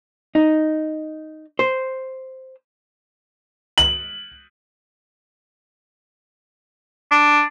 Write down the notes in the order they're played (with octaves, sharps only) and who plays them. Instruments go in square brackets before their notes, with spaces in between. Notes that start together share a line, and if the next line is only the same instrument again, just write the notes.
[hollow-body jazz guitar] D#4
C5
[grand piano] F#7
[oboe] D4